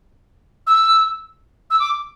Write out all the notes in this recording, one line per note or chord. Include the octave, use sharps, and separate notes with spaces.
E6
E6
D6